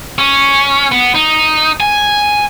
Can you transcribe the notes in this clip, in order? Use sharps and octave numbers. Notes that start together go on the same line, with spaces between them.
C#4
B3
D#4
G#5